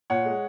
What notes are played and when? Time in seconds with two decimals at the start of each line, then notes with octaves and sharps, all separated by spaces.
0.10 A#2 C#5 F#5
0.25 G#3